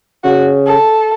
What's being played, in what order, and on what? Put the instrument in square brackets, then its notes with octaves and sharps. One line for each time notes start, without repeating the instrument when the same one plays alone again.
[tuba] C#3 [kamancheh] F#4
[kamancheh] A4